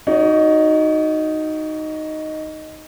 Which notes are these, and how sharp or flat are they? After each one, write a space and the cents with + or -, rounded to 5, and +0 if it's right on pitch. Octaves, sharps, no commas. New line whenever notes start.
D#4 +0 F#4 +0 C#5 +45